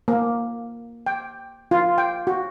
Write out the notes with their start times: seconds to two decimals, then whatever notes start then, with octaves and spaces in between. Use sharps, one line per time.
0.08 A#3
1.06 G5
1.71 F4
1.98 G5
2.27 F#4